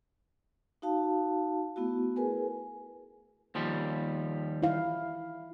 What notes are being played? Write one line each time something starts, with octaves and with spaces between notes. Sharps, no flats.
D#4 F#4 F5 A5
A3 B3 E4 F#4
G#4 A#4 B4 G#5
D#2 F3 G3
E4 F5